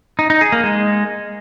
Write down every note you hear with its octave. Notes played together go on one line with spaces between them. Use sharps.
D#4
D#4
G#4
A#3
G#3